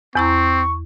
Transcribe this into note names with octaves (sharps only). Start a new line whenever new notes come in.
E2 C4 E4 A#5 C#6